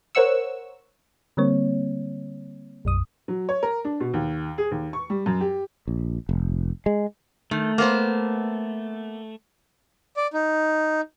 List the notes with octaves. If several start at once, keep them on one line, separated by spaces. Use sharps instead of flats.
A#4 C5 C#5 F#5 C#6 E6
D3 G3 A#3 C4 C#5
B1 F#2 D#6
F#3
C#5
A#4
D4
B2
D#2
G#4
D#2
C#6
G3
F#2
G4
A#1
F1
G#3
D#3 A3
A#3 B3 C5
D5
D#4